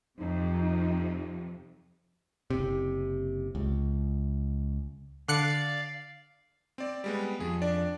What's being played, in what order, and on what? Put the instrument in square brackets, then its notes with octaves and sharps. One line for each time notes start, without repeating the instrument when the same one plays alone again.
[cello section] F2 C3 [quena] D#4
[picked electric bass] F#1 C3
C#2
[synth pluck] D3 F#6 C#7 [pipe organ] D5 F5
[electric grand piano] C4 D5
G3 G#3 B3
[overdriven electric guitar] F2 [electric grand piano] G#4
[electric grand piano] D4 D5